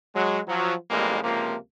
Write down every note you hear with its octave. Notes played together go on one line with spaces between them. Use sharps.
F#3 G#3
F3 F#3
A1 F2 G3 G#3 A#3
C#2 C3 F3 A#3